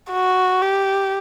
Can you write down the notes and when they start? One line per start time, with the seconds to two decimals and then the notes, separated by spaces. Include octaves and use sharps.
0.11 F#4
0.62 G4